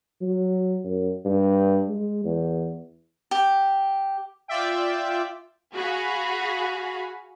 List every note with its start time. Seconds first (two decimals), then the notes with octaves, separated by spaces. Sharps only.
0.21 F#3
0.84 F#2
1.25 G2
1.88 G#3
2.25 E2
3.31 G4
4.48 F4 D5 E5 G5
5.75 F#4 G#4 F5 B5